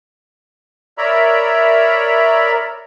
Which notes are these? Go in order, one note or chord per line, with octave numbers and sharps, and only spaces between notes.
A#4 C#5 D5 E5 A#5 B5